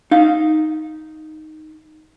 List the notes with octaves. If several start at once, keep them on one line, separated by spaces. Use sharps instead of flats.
D#4 F5